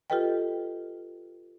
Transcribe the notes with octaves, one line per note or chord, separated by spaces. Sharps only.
F4 G4 A4 B4 D#5 G5